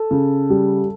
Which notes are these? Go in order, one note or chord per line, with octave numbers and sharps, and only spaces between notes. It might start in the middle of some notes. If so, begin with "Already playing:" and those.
Already playing: A4
C#3
G3